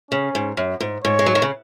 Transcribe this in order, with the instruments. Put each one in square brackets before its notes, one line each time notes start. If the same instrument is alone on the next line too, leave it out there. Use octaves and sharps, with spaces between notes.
[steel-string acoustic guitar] C#3 [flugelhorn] C#4
[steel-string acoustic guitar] G#2
F#2
G#2
[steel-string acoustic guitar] G#2 [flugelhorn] C#5
[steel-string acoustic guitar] G#3
F#3
D#3
C#3